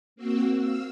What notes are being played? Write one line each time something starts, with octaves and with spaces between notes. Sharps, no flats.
A#3 C4 F#4 E6
F5 E6